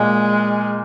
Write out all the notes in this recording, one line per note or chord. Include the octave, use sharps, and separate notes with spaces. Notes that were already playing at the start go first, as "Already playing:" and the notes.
Already playing: A#2 G#3